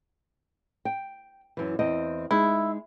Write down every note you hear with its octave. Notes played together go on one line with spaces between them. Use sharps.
G5
F#2 E3
E2 C4 D#5
G#3 D#4 E4